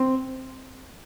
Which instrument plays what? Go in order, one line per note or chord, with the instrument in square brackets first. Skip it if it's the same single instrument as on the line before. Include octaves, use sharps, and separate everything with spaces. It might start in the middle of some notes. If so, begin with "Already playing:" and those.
Already playing: [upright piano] C4